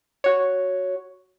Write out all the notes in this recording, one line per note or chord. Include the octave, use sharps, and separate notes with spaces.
F#4 C#5